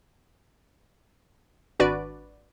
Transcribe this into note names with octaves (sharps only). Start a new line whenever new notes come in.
G#1 D4 F#4 B4 D5 D7